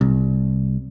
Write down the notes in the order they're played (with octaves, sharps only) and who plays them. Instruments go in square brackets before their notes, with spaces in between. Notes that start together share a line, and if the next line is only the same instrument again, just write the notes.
[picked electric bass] C2